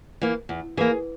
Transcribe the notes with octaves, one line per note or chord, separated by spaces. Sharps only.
E3 A#3
E2
E3 A#3 G#4